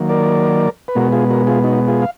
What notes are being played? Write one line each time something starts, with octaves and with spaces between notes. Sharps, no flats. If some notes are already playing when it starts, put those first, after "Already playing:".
Already playing: D#3 F#3 A#3
A#4 D5
B4
B2 G#3 B3 F#4 A#4
F4 G#4
F#4 A#4
F4 G#4
D#4 F#4
F4 G#4
F5